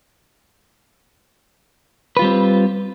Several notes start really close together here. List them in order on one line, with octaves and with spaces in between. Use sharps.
B4 F4 G3 C4